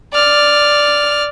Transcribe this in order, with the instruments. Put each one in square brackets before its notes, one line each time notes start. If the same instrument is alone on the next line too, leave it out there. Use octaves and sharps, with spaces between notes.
[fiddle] D5 F6